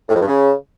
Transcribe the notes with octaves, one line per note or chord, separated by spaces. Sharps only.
A2
F2
G2
C#3